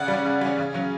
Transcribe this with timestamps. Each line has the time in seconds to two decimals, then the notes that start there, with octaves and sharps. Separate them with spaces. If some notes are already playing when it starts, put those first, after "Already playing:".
Already playing: C#3 D5 F#5
0.08 G3
0.13 C#4
0.25 C#3
0.41 G3 C#4
0.59 C#3
0.74 F#3 C#4